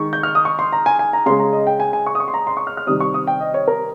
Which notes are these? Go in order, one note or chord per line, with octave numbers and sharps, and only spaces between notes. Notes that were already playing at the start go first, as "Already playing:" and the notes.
Already playing: D#3 G#3 C#6
G6
F6
D#6
C#6
C6
A#5
G#5
G#5
A#5
C#3 G#3 C6
A#5
D#5
G5
G#5
G#5
C#6
D#6
C#6
C6
A#5
C6
C#6
F6
F6
C3 D#3 G3 D#6
C#6
D#6
G5
D#5
C#5
A#4